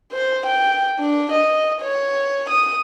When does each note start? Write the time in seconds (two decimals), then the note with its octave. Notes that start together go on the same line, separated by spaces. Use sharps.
0.13 C5
0.46 G5
0.99 D4
1.32 D#5
1.82 C#5
2.50 D#6